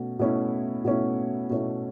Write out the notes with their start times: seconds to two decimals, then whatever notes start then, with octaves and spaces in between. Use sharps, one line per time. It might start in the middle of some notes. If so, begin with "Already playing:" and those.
Already playing: B2 A3 C#4
0.19 B2 A3 C#4 E4
0.85 B2 A3 C#4 E4
1.50 B2 A3 C#4 E4